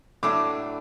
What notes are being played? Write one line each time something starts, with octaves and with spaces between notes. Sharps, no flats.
A2 F#3 A3 D4 D6